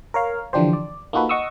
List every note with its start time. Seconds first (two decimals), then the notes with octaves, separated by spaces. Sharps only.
0.14 A#4 C#5 F5
0.53 D3 E3 F3 D4 G4 C5
0.73 D5
1.13 A#3 D#4 F4 F#4 A4 B4
1.29 D#5 F#5 C#6 D#6 E6